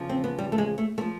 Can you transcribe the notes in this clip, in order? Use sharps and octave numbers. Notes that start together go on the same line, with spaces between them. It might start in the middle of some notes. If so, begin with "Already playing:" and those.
Already playing: E2 C#3 F3
C4
B3
G3
A3
G#3
A3
A3
F3